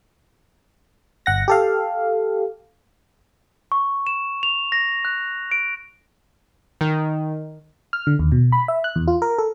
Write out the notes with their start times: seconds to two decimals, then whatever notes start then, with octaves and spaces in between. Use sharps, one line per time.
1.26 G1 F#5 A#6
1.48 G4 A4 F5
3.72 C#6
4.07 E7
4.43 F7
4.72 A#6
5.05 F#6
5.52 D7
6.81 D#3
7.93 F6
8.07 D3
8.19 D#2
8.32 B2
8.52 B5
8.68 E5
8.84 F#6
8.96 E2
9.08 F4
9.22 A#4
9.39 A4